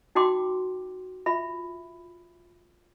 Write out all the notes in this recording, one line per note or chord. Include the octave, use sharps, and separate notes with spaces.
D#4 F#4 G5 C6 D6
F4 E5 B5